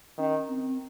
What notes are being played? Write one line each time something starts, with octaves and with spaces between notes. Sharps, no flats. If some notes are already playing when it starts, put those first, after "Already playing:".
D#3 C#4
C4